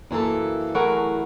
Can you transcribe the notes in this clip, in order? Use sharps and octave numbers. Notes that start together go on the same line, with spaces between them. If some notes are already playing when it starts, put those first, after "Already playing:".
F#2 E3 A#3 A4
E3 F#3 A3 F#4 G#4 A#4